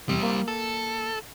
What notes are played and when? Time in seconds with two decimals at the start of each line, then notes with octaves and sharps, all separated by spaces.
0.09 E2 C3 G3 C4
0.23 A#3
0.48 A4